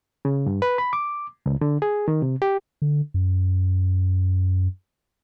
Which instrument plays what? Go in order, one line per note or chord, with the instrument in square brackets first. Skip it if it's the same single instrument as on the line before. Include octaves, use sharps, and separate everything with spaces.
[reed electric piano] C#3
G2
B4
B5
D6
C#2
D3
G#4
D#3
C3
G4
[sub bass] D3
F#2